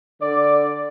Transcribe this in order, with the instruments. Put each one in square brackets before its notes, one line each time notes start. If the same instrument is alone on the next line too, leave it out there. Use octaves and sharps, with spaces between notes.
[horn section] D3 D5